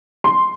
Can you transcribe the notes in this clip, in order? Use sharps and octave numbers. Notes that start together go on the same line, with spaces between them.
C6